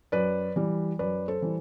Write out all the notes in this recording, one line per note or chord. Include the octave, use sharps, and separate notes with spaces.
F#2 B4 D5
E3 G3
F#2 B4 D5
A4 C5
E3 G3